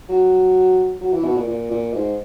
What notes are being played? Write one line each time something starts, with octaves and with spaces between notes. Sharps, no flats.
F#3
F#3
E3
B2
A#2
A#2
A#2
G#2